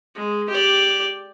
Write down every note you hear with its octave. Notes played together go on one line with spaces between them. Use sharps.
G#3
G4 D5